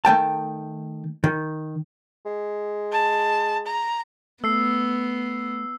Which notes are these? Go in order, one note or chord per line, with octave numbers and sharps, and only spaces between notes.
D#3 A3 G5 A5
D#3
G#3
A5
A#5
A3 B3 E6 C7